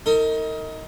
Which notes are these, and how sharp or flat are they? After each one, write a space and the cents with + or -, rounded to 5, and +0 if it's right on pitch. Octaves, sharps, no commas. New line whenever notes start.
D#4 +25 A#4 -40